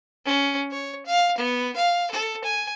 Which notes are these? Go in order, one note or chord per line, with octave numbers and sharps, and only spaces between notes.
C#4
C#5
F5
B3
F5
A4
G#5